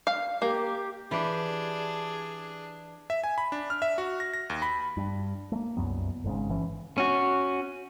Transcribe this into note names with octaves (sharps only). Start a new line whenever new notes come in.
F5
A#3 G4
E3 D4 G4 G#4
E5
G#5
B5
D4
F6
E5
F#4
A#6
A#6
D#2
B5
G2
A3 A#3
C2 F#2 F#3 B3
G#1 G#2 C#3
G1 E3 C#4
C#4 F#4